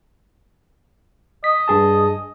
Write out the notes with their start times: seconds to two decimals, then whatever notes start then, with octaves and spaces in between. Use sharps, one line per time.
1.44 D#5 B6
1.68 G2 G#4 A5